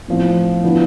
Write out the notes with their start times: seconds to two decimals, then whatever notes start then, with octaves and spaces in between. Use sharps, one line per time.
0.08 A2 F3 C4
0.64 D3 F3 B3 E4